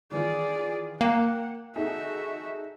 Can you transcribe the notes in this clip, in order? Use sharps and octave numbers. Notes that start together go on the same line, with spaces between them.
D#3 E3 F4 G#4 D5
A#3 F#5 G5 F#6 E7
D#4 F#4 G#4 A4 E5